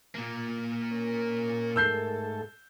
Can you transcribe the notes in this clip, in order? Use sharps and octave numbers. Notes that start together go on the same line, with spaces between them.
A#2 A#3
C#4 A#4
G#2 A3 A4 E6 G6 C7